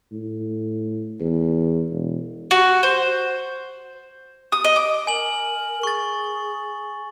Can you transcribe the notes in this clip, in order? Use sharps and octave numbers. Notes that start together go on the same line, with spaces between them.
A2
E2
E1
F#4
C5
D#6
D#5
D6
A#4 G#5 F#7
G#4 C#6 A6